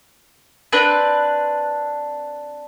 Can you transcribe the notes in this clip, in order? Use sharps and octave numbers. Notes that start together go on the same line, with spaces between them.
C4 D4 B4